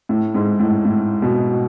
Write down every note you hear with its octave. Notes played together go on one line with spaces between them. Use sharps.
A2
G#2
A2
A2
B2